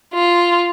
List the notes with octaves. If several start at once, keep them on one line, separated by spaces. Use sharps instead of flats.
F4